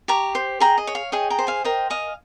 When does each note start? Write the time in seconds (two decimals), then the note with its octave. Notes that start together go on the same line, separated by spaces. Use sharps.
0.08 G4 A#5 C#6
0.35 C5
0.60 G#4 G5 A#5
0.78 D#5
0.87 C#5
0.95 F5
1.12 G#4 D#5 G5
1.30 G5 A#5
1.39 C5
1.47 F5 G#5
1.64 A#4 D#5 G5
1.90 D#5 F5 G#5